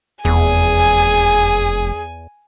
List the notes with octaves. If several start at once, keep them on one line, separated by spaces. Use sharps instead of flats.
F1 E2 G#4 G#5